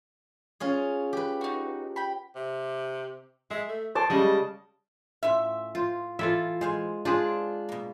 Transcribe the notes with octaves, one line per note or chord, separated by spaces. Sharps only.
C#4 F4 G#4
G4 B4
D#4 F#4
G5 B5
C3
G#3 E5
A3
C5 A5 D6
C#3 G3 G#3 D#5
A2 C#4 F4 E5
F4 C5
E3 E4 F4 A4 E5
G#3 C5 F5 G#5
C4 D4 F4 G#4 C5 D5
B2 A#3